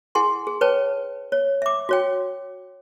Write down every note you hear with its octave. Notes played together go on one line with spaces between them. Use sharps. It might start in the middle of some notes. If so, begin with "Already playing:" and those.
E4 G#4 F#5 G#5 C6
G#4
B4 C#5 G5 A5
C#5
E5 D6
F#4 C#5 G5